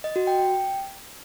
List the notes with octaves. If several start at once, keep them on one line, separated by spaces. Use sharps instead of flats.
D#5
F#4
G5
G5